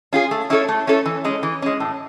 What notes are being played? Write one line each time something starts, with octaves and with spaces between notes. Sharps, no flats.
C#4 F4 G#4
A3
C#4 E4 A4 C#5
A3
C#4 E4 A4 C#5
E3
G#3 C#4
E3
G#3 C#4
A2